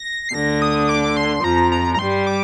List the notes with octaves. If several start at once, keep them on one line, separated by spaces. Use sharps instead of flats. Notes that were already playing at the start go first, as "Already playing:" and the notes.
Already playing: A#6
C7
D2 D3 A#6
D#6
D6
C6
F2 F3 A#5
A#5
A#5
G2 G3 C6
D6